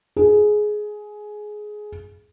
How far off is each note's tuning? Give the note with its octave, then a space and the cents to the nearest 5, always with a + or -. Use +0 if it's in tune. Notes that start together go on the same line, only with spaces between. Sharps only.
G#4 +15